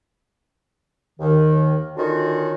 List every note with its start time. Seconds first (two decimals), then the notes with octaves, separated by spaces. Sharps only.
1.20 D#2 D#3
1.97 D3 D#3 C#4 F4 F#4